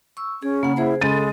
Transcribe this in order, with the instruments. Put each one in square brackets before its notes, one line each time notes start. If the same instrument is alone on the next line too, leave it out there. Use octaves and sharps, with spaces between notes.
[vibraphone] C#6 E6
[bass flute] C#4 [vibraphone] G#4
[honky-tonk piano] C#3 [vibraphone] A#3 F#5
[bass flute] E4 [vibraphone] G#4 C5
[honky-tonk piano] C#3 A6 D#7 [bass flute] G#3 [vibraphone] A4